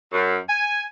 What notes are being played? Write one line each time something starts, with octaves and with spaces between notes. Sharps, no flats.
F#2
G#5